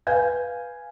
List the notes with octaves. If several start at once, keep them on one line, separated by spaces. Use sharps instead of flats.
B4 F5 G#5 G6 G#6